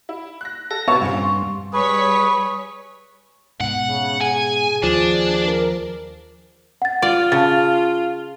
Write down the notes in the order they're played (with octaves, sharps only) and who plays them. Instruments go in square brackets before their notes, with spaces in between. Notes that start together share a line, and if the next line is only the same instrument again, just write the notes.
[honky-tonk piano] E4
F#6 A#6
[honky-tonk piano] A4 [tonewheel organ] A#6
[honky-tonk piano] C3 E5 [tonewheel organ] B3 C#5 A5 [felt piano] C#6
[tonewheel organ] G2 [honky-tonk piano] A#2 C#3 C4
[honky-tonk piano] C6
[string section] G3 C#5 B6 [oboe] G#4 [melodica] B4 [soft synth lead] C#6
[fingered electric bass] G#2 B2 [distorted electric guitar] F#5
[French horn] C#3
[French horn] G#4 [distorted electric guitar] G#5
[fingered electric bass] D#2 [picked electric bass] F3 [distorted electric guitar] D4
[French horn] A#4
[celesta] F#5 A6
[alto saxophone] F4 [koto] D5
[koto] C#3 [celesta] A5 A6